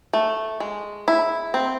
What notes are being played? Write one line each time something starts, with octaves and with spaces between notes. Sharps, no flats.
A3
G#3
E4
C4